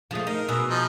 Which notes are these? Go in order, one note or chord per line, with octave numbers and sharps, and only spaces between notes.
F3 A3 D4 G#4 C5
D#4 A#4
B2 G#5 D#6 E6
F3 D#4